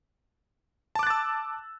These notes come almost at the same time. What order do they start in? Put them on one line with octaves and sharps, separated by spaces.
A5 D6 F#6 A6 E6